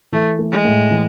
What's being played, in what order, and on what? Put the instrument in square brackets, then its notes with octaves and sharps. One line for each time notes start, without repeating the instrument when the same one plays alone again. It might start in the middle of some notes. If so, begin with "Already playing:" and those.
[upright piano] E3 [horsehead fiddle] A3
[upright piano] A3
[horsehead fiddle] G#3
[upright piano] A2
E3